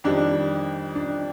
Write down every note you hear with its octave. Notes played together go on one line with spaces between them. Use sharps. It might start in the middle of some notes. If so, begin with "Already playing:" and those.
F2 D#3 G3 D4
D4